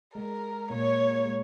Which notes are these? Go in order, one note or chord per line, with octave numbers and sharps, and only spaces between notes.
G#3 A#4
A#2 A#3 C#5
G#3